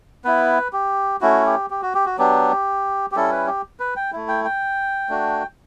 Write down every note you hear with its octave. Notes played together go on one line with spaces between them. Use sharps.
B3 E4 B4
G4
A3 C#4 E4 F#4
G4
G4
F#4
G4
F#4
F#3 B3 D4 G4
G4
G3 C#4 E4 A4
B4
G4
B4
G5
A3 E4
G5
G5
A3 D4 F#4